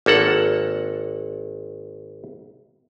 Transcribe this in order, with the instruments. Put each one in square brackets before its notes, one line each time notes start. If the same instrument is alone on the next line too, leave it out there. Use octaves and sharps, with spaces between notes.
[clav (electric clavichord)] G#1 A#3 A4 F#5